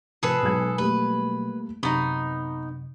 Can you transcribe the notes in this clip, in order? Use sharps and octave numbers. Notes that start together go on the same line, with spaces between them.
A2 C3 F3 G#4 A4 B4
B1 B2 F#3 G#3 G#6
G3 A3 A#3 B4
F#2 C3 B3 D#4 C#6